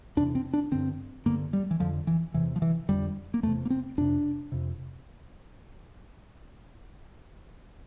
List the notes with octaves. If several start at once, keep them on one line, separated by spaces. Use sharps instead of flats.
E2 C3 D4
C4
D4
G2 D3 C4
G2 D3 A#3
G3
E3
F2 D3 F3
E3
E2 C3 E3
F3
E3
F2 D3 G3
A#3
E2 C3 A3
A#3
C4
F2 C3 D4
F2 C3